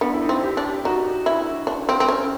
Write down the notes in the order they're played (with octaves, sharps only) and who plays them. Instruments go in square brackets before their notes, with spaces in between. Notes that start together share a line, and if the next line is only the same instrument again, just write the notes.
[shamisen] B3 [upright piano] D4
[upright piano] E4
D#4
[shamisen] C4
[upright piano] G4
[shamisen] D4
[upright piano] G4
[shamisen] D#4 [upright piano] F#4
[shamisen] E4
D4
C4
C4
C#4